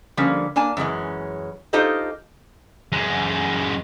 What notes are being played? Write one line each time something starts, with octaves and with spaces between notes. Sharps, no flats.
D3 F3 G3 A#3 C#4
A#3 D4 G#5 A5
F#2 E3 G#3 C#4
D#4 F4 G4 A4 C5 D#5
F#2 G#3